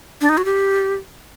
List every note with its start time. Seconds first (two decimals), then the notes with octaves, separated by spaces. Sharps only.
0.21 D4
0.29 D#4
0.37 F#4
0.45 G4